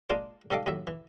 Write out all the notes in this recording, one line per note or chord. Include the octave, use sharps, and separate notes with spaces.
G#3 A#3 D4 F4 D5 D6
G#2 G3 A4 D#5 F5 D6
D#2 A2 F#3 E5
E3